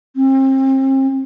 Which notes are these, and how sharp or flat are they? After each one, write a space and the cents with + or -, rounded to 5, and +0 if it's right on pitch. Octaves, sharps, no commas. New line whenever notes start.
C4 +35